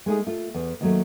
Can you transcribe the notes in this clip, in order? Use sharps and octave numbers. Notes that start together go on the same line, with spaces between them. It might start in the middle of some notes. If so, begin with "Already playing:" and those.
G#3 A3 D#4 G#4
A3 F4
E2
D#2 F#3 A3